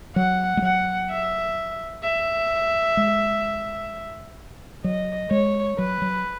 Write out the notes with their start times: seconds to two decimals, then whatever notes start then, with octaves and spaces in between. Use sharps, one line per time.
0.16 F#3 F#5
0.57 G#3
0.62 F#3 F#5
1.10 E5
2.03 E5
2.97 G#3
4.84 F#3 D#5
5.31 G#3 C#5
5.78 F#3 B4
6.02 F#3